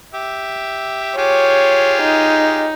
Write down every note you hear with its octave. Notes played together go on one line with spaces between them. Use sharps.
G4 E5
F4 G4 G#4 C#5
D#4